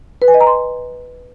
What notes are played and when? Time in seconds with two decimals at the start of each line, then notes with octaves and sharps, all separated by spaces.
0.22 B4
0.28 G#5
0.34 D#5
0.41 A#5
0.47 C6